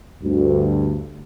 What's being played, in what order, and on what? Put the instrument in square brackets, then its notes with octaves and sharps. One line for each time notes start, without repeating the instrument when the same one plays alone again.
[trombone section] D2 G2